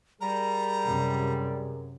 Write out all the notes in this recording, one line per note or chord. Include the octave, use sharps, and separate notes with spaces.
G3 G#4 A#4 A#5
F#2 C3